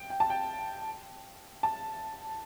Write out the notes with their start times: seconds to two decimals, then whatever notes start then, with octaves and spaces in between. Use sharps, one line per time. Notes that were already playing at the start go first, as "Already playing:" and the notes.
Already playing: G5
0.10 G5
0.20 A5
0.30 G5
1.63 A5